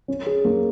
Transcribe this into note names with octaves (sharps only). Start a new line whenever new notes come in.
C#4
G#4
A#3